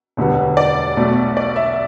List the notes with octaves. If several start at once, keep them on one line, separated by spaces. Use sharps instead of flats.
E1 D2 D3 G3 B3
D5
B1 B2 A3
D5
E5